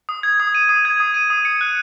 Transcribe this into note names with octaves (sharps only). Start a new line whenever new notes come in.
D#6
G#6
D#6
D#7
D#6
G#6
D#6
D#7
D#6
C#7
F#6